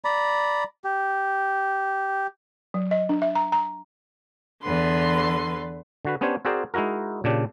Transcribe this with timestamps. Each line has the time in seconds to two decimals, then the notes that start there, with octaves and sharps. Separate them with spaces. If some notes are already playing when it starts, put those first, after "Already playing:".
0.05 D5 A#5 B5
0.84 G4
2.74 F#3
2.91 D#5
3.09 D4
3.22 E5
3.35 A#5
3.52 A#5
4.63 E2 D3 B4 C6
6.05 D3 F#4 B4
6.21 B3 C#4 D4 G4 C5 C#5
6.45 C4 F#4 G#4 A#4 C5 D5
6.74 G#3 D#4 E4 F#4 A#4
7.24 A#2 C#3 D4 G4